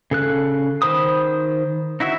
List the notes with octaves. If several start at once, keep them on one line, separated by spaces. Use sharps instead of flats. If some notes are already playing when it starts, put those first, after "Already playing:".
C#3 A4 F#6
D#3 C5 B5 D#6
D#4 E4 F#4 E5